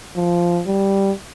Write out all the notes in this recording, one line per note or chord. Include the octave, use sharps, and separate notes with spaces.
F3
G3